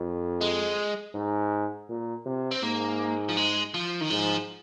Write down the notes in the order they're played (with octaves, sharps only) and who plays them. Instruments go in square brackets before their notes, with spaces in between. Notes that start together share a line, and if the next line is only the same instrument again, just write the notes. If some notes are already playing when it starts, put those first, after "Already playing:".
Already playing: [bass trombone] F2
[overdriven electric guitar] G#3
[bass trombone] G#2
A#2
C3
[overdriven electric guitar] C4
[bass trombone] G#2 [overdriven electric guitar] A#3
[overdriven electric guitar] F3
G#3
F3
D#3
[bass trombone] G#2 [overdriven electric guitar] F3